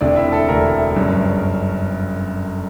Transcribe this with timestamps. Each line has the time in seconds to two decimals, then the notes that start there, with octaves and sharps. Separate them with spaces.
0.01 E1 D2 C3 D4 D5
0.16 E4 E5
0.32 A4 A5
0.48 E1 D2 C3 A#4 A#5
0.96 G1 F#2 C#3